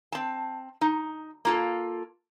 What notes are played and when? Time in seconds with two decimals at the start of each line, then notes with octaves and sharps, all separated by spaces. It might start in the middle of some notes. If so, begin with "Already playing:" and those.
0.12 C4 A5
0.81 D#4
1.45 A#3 F4 A4